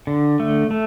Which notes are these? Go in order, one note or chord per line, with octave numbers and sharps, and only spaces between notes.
D3
A3
A3